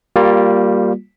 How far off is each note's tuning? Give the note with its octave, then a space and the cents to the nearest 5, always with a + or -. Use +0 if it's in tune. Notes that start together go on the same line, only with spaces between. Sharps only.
G3 +0 A#3 +0 F4 +25